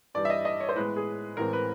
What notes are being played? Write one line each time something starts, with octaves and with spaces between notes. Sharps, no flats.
G2 E3 G3 D5
E5
D#5
D#5
C#5
C5
A2 E3 G#3 B3 B4
G#4
A1 A2 E3 G#3 C4 A#4
B4